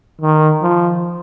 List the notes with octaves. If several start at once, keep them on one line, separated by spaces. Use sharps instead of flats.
D#3
F3